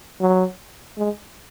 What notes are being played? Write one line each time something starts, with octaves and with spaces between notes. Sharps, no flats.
F#3
G#3